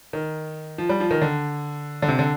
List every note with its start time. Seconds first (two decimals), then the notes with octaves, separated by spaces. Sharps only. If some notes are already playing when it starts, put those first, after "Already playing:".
0.13 D#3
0.78 F3
0.89 G3
1.00 F3
1.11 D#3
1.22 D3
2.02 D3
2.08 C3
2.19 D3